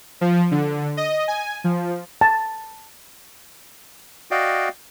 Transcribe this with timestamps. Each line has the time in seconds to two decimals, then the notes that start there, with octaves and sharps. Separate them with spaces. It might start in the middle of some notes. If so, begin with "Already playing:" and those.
0.21 F3
0.51 D3
0.97 D#5
1.28 G#5
1.64 F3
2.21 A5
4.31 F#4 D5 D#5 F5 G5